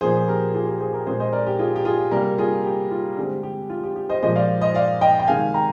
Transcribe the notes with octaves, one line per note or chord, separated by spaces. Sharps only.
A#2 F3 A#3 G#4 C5
G4 A#4
F4 G#4
G4 A#4
G#4 C5
G4 A#4
A#2 G#3 C4 G#4 C5
C5 D#5
A#4 D5
G4
F4 G#4
G4
F4 G#4
C3 G3 A#3 G4 A#4
F4 G#4
G4
F4
D3 G#3 C4 G4
G4
F4
G4
G4
C5 D#5
A#2 F3 G#3 C5 D#5
D5 F5
C5 D#5
D5 F5
D#5 G5
G5
C3 D#3 G#3 F5 G#5
G5 A#5